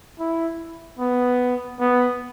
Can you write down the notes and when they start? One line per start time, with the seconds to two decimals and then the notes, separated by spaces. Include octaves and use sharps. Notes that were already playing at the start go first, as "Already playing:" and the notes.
0.19 E4
0.99 B3
1.79 B3